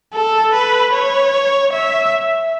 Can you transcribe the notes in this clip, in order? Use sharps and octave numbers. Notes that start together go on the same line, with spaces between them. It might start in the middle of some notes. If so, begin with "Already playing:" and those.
A4
B4
C#5
E5